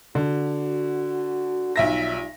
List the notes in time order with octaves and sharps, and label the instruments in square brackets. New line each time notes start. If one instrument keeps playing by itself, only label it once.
[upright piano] D3 [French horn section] F#4
[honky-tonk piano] B1 E5 A#6 [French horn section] G3 D#4 F4